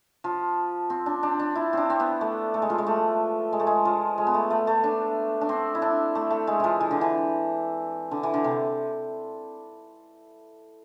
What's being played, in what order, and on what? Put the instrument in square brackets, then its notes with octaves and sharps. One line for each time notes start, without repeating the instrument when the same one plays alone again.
[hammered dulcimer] F3
C4
D4
D4
D4
E4
C4 D4
C4
B3
A3
A3
G#3
F3
G#3
A3
G#3
A3
G#3
F3
G#3
B3
A3
A3
A3
D4
D4
C4
E4
D4
A3
A3
G#3
E3 F3
E3
D3
E3
D3
E3
D3
C3